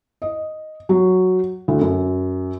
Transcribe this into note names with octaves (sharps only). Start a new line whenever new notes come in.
D#5
F#3
D2
F#2